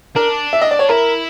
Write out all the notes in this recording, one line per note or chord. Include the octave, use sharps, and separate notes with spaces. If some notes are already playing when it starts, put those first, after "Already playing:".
D4 A#4
E5
D#5
D5
C#5
E4 A#4